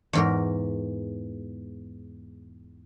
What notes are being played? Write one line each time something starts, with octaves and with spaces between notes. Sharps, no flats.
E2 G#2 A#4